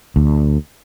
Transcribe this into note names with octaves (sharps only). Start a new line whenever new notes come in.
D2